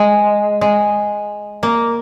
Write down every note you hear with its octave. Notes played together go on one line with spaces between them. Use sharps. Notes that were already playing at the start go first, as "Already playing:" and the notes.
Already playing: G#3
G#3
A#3